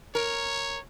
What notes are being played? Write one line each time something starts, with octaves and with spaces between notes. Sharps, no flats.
A#4 C#5